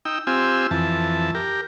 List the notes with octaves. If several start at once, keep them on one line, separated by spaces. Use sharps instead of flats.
D#4 G5 E6
C4 F4 G4 G#5 E6
F2 E3 A5
G4 A#4